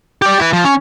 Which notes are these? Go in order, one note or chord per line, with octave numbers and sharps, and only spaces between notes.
G4 D5
E4 B4
F3
C#4